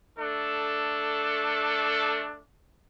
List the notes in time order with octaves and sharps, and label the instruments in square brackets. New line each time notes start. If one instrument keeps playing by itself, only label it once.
[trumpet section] A3 D4 A4